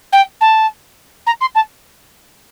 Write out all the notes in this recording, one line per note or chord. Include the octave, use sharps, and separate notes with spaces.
G5
A5
A#5
C6
A5